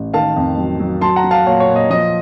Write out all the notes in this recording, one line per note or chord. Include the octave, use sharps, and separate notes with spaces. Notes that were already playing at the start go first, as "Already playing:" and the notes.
Already playing: A1
D#3 F5 A5
F2
F#3
F#3
F#3 A5 C6
F#5 A#5
F#3
F5 A5
A#2 C#5 F5
C#5
A#2
D#5
F3 D#5